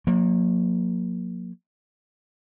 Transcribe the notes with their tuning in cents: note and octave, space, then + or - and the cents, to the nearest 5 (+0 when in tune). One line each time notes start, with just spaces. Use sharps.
F#3 -45 A#3 +0